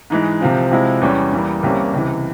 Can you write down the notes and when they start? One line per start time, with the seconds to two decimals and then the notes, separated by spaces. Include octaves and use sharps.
0.10 G#2 E3 G#3
0.41 C2 C3 F3 C4
0.71 C3 F3 G#3 E4
1.01 E2 E3 G3 C#4
1.33 E2 E3 G3 A#3
1.63 C2 C3 G3 A#3 C#4
1.93 C#2 C3 E3